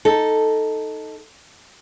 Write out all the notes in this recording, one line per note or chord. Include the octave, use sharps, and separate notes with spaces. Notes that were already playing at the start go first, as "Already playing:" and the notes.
D#4 A4